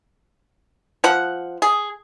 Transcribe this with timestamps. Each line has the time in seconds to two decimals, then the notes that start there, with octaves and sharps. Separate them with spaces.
1.04 F3 F#5
1.62 G#4